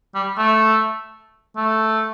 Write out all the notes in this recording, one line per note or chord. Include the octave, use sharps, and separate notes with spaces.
G3
A3
A3